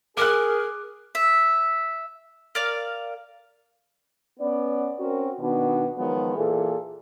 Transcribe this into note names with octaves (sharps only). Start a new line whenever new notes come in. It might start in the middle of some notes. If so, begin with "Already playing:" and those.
G#4 A#4 D6 F#6
E5
A#4 D5 F5
B3 C#4 D5
C4 C#4 F#4 A#4
B2 D#3 B3 D4 F#4
D#3 F3 F#3 G#3 B3
A#2 E3 G#4 A4